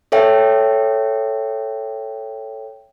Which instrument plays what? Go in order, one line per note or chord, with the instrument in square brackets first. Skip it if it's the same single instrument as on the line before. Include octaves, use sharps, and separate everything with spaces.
[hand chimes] A4 C#5 E5 G5